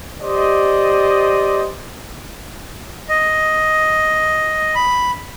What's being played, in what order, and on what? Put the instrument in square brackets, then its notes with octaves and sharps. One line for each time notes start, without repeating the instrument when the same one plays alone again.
[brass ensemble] G4 C5 D5 D#5
[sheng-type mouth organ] D#5
B5